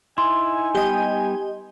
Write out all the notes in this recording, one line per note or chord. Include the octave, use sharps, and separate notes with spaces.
D#4 E4 G#5 C6
G3 B3 G4 D#5 G5